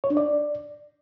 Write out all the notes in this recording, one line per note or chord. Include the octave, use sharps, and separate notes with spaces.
C#5
D4
D5